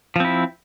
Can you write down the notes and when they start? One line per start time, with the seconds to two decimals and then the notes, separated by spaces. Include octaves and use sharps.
0.16 F3
0.20 C4
0.25 E4